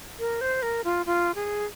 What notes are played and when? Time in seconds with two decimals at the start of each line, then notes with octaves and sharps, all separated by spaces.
0.19 A#4
0.41 C5
0.62 A#4
0.84 F4
1.06 F4
1.35 G#4